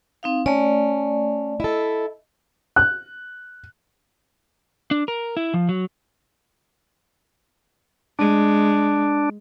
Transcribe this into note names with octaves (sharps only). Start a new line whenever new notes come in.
C4 D#4 F5
A3 C#4 D5
E4 A4 D#5
F#6
D4
A#4
E4
F3
F#3
G#3 D4